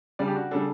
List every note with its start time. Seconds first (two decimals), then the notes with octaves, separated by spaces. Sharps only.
0.19 C#3 G3 D4 D5
0.27 G4
0.36 F#4
0.51 C#3 G3 D4 A4